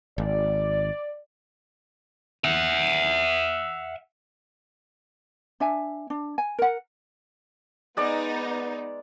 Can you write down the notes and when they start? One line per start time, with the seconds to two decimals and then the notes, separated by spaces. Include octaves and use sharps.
0.18 G#1 D5
2.44 E5 F#5
5.60 D4 E5 G#5
6.10 D4
6.38 G#5
6.59 A#4 F#5
7.97 G#3 B3 D#4 D5